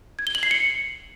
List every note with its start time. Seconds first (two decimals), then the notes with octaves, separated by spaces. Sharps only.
0.19 G#6
0.27 G7
0.35 F#7
0.43 C7
0.51 C#7